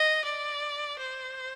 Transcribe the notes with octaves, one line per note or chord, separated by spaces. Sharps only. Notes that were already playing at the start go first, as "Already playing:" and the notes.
Already playing: D#5
D5
C5